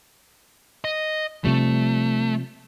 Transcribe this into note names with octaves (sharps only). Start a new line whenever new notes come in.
D#5
C3 F3 G3 A3